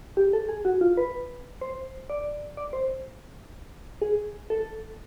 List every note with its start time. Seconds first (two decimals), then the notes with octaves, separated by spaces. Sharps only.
0.17 G4
0.33 A4
0.49 G#4
0.65 F#4
0.81 F4
0.97 B4
1.61 C5
2.10 D5
2.57 D5
2.73 C5
4.02 G#4
4.50 A4